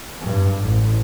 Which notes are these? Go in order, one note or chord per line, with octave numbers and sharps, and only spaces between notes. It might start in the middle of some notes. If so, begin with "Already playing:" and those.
G2
A1